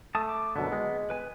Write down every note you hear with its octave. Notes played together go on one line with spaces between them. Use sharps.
A3 A5 D#6
D6
F#2 B2 D3 B3
G#3
B4 G#5